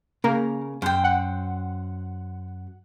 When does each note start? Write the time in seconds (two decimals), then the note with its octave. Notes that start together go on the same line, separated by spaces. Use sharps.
0.24 C#3 A#3 A#4
0.82 F#2 C5 G5
1.04 F#5